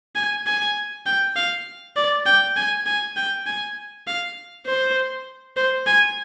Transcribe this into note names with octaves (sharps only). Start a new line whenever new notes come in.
G#5
G#5
G5
F5
D5
G5
G#5
G#5
G5
G#5
F5
C5
C5
G#5